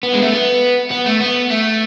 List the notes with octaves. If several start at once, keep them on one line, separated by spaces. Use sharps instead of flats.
B3
G#3
A3
B3
B3
A3
B3
A3